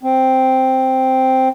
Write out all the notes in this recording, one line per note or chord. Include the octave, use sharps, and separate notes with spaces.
C4